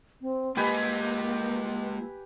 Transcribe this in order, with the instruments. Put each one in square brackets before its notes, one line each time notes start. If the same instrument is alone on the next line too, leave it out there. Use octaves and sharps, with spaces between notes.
[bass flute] C4
[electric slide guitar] G#3 F4 D#5 [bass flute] A#3 [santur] G4 B4 G#5